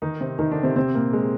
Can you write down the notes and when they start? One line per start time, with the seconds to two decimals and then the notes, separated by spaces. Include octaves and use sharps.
0.02 D#3 D#4
0.20 C3 C4
0.39 D#3 D#4
0.51 D3 D4
0.63 C3 C4
0.76 C3 C4
0.95 A#2 A#3
1.13 G#3